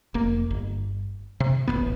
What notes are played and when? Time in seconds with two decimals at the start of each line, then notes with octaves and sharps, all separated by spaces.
0.14 F1 A#3
0.51 G1
1.40 C3
1.68 D1 A1 A2 B3